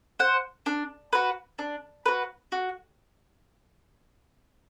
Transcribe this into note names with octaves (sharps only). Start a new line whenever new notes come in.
C5 F#5
D4
F#4 B4
D4
F#4 B4
F#4